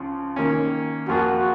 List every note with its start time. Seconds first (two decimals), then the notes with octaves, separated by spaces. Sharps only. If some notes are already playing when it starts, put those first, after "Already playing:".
Already playing: C#2 C#3 F3
0.36 D#3 A#3 C#4
1.08 F2 F3 A#3 F4 F#4 G#4